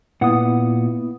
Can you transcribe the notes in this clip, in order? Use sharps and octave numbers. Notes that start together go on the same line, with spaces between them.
A#2 B3 E4 F#5 D#6